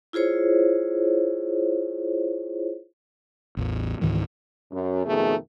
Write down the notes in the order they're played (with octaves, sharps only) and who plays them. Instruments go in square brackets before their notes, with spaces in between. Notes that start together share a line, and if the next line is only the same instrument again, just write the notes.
[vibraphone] E4 F4 G#4 C5 C#5
[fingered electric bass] A1 E2
C#2 G#2 D#3 E3
[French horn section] F#2
F2 B2 D#3 A3 G#4